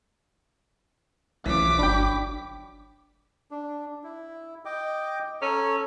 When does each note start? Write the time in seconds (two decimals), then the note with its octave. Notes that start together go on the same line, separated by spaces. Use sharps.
1.46 B1 E3 F3 C#4 D6 B6
1.79 G1 F#3 D4 G5 B5
3.51 D4
4.04 E4
4.65 D#5 G5 D6
5.42 C#4 A4 C#5 A#5